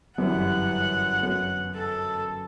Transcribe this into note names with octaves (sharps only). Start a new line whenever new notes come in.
G1 F#2 E3 G3 F#5
F#2 F#3 B3
A4